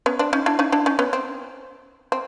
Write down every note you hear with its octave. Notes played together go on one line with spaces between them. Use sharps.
B3 C#4
C4 D4
C#4 D#4
D4 E4
C#4 D#4
D4 E4
C#4 D#4
B3 C#4
C4
C4